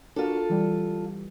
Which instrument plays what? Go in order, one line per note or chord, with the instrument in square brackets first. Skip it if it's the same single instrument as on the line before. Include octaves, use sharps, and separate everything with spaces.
[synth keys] D4 F#4 A#4 [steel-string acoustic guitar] F4 A4
[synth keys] E3 G3